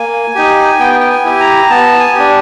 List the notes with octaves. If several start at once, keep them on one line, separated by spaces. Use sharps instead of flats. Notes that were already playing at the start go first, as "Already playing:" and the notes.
Already playing: A#3 G#5
D#4 G4
B3 G5
G5
G#5
E4 G4
A#5
B3 A5
G#5
D4 G4